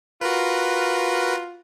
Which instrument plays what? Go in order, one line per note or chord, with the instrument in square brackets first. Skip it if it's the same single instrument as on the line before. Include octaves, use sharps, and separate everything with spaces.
[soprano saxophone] F4 [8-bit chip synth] F#4 A#4 B4